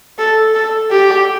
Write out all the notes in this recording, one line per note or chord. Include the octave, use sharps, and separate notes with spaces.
A4
A4
G4